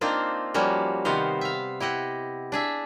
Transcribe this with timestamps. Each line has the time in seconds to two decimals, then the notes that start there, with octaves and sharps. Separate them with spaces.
0.01 A#3 C4 D4 D#4 F4 C5
0.54 F3 G3 A#3 C#4 F#4
1.05 C3 D#3 B3 D#4 C5 F5
1.41 E5 F5
1.80 E4 G4 D#5 F#5
2.52 D4 G#4 E5